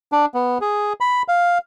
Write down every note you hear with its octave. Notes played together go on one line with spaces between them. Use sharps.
D4
B3
G#4
B5
F5